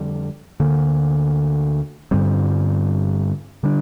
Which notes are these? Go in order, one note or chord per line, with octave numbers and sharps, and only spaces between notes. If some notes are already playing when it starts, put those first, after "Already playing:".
Already playing: F2 D3 G3
D2 D3 A#3
G2 D3 G3 C4
D3 G3 D4